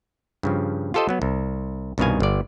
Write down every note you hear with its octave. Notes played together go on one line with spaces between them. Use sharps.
G2 C#3 F3
F4 G4 A4 C5 D#5
F#3 B3
C2
C2 G2 B2 D#3 F5 G#5
G1 D5